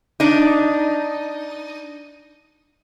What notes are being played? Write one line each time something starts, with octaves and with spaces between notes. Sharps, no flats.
D4 D#4